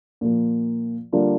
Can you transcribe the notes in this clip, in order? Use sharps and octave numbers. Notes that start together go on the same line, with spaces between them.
A#2 F3 A#3
D3 G3 A#3 D4 F4